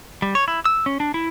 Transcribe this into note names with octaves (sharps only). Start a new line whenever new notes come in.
G3
C#5
E4
E6
C#4
D4
E4